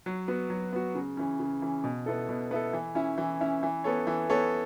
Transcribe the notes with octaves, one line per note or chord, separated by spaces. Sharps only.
F#3
B3 F#4
F#3
B3 F#4
C#3
E3 C#4
C#3
E3 C#4
B2
B3 E4 A4
B2
B3 E4 A4
E3
C#4 E4
E3
C#4 E4
E3
B3 A4 C#5
E3
B3 A4 C#5